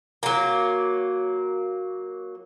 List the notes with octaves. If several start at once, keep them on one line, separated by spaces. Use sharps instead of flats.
F#3 A#3